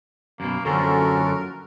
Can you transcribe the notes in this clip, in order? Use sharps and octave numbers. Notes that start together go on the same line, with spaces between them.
F#2 B2 A#3
F#2 D3 F3 C#4 F#4 A4 A#4